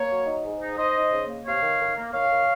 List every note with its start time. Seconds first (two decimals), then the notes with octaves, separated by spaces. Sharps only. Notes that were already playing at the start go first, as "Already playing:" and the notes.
Already playing: A#3 A#4 C#5
0.10 F#3
0.27 D#4
0.44 G#2
0.61 D#4
0.77 D#4 C5 D#5
0.95 D#4
1.12 C#3
1.28 A#3
1.45 C3 C#5 F5
1.62 D#3
1.79 D#3
1.96 A#3
2.13 D#3 C#5 F5
2.30 D#3